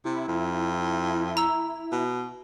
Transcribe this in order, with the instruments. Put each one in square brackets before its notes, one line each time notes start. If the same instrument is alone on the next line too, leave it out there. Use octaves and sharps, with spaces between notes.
[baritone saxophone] C3 [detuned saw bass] E4
[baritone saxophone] F2
[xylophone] A#5 E6
[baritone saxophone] B2